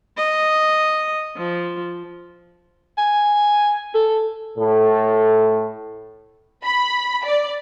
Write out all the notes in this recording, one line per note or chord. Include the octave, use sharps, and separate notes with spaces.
D#5
F3
G#5
A4
A2 A4
B5
D5